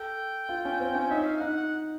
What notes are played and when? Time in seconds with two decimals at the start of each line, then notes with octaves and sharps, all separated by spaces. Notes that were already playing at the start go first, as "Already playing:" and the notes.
Already playing: A4 G5
0.49 F4
0.65 C#4
0.80 C4
0.95 C#4
1.10 D#4 E5
1.26 F5
1.41 D#4 F#5
1.57 F#5